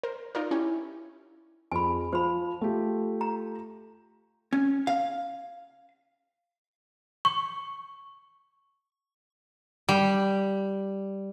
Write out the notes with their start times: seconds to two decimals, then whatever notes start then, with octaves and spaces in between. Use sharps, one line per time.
0.03 A#4 C5
0.35 D#4 F4 A#4 D5
0.51 C#4 E4 G4 C#5
1.72 F2 G#4 G#5 B5
2.13 F3 C5 B5
2.61 A3 F4 G4
3.21 A#5
4.53 C#4
4.87 F5
7.25 C#6
9.89 G3